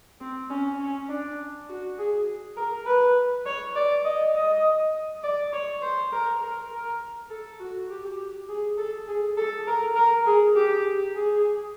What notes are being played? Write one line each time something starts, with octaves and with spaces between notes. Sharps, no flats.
C4
C#4
C#4
D4
F#4
G#4
A#4
B4
C#5
D5
D#5
D#5
D5
C#5
C5
A#4
A#4
A#4
A4
F#4
G4
G#4
A4
G#4
A4
A#4
A#4
G#4
G4
G#4